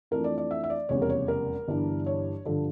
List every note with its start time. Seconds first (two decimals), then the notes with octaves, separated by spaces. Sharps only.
0.11 F2 E3 A3 D4 A#4
0.24 D5
0.38 D5
0.51 E5
0.64 E5
0.70 D5
0.89 F1 E2 C#3 G3 C#5
1.02 A#4
1.09 C#5
1.28 A#4
1.68 G1 G2 E3 G3 D4
2.06 C#5
2.45 G2 D3 F3 A4